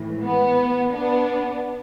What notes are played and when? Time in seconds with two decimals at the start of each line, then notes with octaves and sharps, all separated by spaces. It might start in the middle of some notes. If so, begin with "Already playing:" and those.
Already playing: A2 E3
0.24 B3
0.93 B3 D4